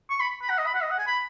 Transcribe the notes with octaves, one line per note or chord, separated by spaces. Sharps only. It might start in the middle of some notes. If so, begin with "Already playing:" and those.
C#6
B5
B5
F#5
D#5
B5
F#5
D#5
F#5
G#5
B5